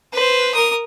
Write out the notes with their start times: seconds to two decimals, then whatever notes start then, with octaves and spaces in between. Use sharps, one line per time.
0.13 B4 C5
0.54 A#4 D#6